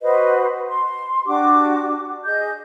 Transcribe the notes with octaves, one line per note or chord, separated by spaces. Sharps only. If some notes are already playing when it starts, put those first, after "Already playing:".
F#4 B4 C5 D#5
C6
D4 F#4 G4 D6
G#4 D#5 G6